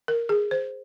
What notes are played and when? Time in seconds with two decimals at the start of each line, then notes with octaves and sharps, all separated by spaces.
0.08 A#4
0.29 G#4
0.51 C5